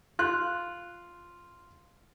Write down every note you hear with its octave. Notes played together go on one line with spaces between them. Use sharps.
F4 F#6